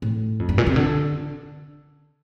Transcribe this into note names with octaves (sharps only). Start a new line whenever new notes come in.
A2
F2
G2
A#2
C3
D3